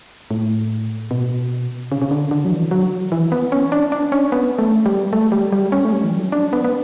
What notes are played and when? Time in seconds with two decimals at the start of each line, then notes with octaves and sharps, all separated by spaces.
0.31 A2
1.11 B2
1.92 C#3
2.02 C#3
2.11 D3
2.31 D3
2.45 F#3
2.51 E3
2.71 F#3
3.12 E3
3.32 B3
3.52 C#4
3.72 D4
3.92 D4
4.12 C#4
4.32 B3
4.59 A3
4.86 G3
5.13 A3
5.32 G3
5.52 G3
5.72 C#4
5.85 A3
5.93 G3
6.04 E3
6.12 F#3
6.32 D4
6.53 B3
6.64 B3